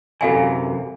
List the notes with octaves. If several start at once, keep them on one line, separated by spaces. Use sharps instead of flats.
F#2 C3 E3 A4 F5 G#5